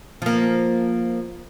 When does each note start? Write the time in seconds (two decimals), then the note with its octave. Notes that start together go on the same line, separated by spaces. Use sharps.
0.22 F3 A#3